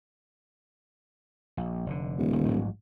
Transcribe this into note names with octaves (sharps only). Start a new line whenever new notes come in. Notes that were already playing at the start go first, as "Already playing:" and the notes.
A#1
F1 G#2 D3
D#1
G1 D2
A1 G#2 F#3